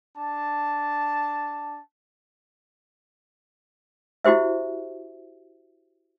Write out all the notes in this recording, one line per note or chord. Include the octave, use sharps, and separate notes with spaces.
D4 A5
E4 F#4 G4 C5 E5